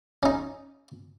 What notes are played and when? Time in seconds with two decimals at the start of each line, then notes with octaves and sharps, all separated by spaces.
0.23 C#4 D#4